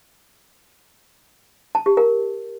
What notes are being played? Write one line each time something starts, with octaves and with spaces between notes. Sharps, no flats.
A5
G4
A#4